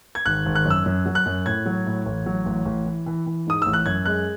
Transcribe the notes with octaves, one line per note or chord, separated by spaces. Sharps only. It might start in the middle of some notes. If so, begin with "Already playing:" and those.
G#6
G#1 F#6
G#1
F#6
F#2
E6
F#2
F#3
F#6
F#2
A2 G#6
F#3
A2
A1
F#3
A1
A1
E3
E3
E3
G#2 D#6
A1 E6
F#6
F#2 G#6
G#3 F#6